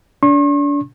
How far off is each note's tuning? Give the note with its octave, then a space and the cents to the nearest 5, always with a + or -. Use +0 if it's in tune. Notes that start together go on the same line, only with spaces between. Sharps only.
D4 -35 C#6 -45